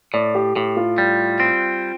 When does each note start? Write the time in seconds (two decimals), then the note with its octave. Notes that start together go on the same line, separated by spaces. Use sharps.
0.14 A2 D5
0.35 G4
0.56 A2 G4
0.77 F4
0.98 G3
1.40 C4